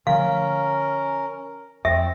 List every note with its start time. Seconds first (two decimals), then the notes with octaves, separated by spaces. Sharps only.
0.07 D3 F3 A3 C#4 A#4 F5
1.85 F2 C4 E5